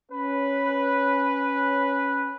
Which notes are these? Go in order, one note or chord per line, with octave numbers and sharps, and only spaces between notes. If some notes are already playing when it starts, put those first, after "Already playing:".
C#4 B4